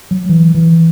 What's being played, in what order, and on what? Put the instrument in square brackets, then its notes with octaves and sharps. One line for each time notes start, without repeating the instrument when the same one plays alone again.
[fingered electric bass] F#3
E3
E3